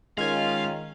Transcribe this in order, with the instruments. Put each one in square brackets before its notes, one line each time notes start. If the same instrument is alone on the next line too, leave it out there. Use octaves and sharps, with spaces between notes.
[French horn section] D#3 [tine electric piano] G#3 G#6 [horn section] C#4 F4 [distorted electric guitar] F5